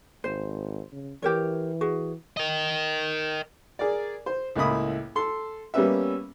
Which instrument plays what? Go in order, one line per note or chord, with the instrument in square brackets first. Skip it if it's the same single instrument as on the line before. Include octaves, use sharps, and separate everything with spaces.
[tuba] G#1 [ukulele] C5
[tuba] C#3
[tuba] E3 [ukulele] G4 A#4 C#5
[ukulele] F#4 G#4
[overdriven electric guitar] A#4 D#5
[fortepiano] G#4 A#4 D5
C5
C#2 A2 A#3 E4 B5 D#6
A4 C6
G3 A#3 B3 C#4 B4 E5